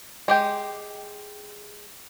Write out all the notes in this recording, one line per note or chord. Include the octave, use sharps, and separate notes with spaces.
G#3 G4 G5